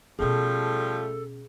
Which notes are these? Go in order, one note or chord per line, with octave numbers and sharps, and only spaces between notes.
B2 F3 G3 A3 C#4 G#4 A4